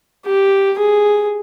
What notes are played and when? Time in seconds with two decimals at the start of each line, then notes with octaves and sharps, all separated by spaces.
0.26 G4
0.79 G#4